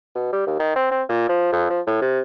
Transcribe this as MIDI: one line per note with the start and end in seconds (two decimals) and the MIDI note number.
0.16 0.28 47
0.33 0.45 55
0.47 0.55 39
0.60 0.75 51
0.76 0.87 60
0.91 1.02 60
1.09 1.25 46
1.29 1.48 53
1.52 1.68 41
1.70 1.80 53
1.87 1.97 45
2.02 2.20 48